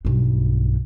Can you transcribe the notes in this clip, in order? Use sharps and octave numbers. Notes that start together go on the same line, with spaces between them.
B1 G2